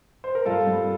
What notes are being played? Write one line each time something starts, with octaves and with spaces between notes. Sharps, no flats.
C5
A#4
G2 F4 A4
G2